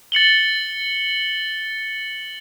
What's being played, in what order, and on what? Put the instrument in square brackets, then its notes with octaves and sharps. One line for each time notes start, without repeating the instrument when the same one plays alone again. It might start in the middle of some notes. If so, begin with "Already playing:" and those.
[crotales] A6 C#7 F#7 G7